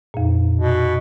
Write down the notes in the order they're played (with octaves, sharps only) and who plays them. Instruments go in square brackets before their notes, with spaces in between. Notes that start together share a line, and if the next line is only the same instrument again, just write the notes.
[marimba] F2 A#2
[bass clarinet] B2